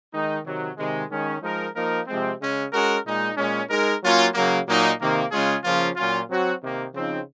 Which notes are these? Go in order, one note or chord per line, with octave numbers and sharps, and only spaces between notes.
D#3 G#3 D#4
C3 D#3 F#3
C3 D#3 G#3
D#3 G#3 C#4
F3 G#3 D#4 A#4
F3 A#3 D#4 A#4
C3 F3 G#3 C4
C#3 G#3 C#4
G#3 C#4 F#4 A#4
A#2 G#3 D#4
A#2 G#3 C#4
G#3 D#4 A#4
F#3 A#3 C#4 F4
C#3 F#3 A#3
A#2 F#3 A#3 D#4
C3 D#3 A#3
C#3 G#3 C#4 F4 G#4
C#3 F3 A#3 C#4 F4
A#2 F#3 C#4 F4
F#3 C4 F#4
C3 D#3 A#3
C#3 F3 C4 D#4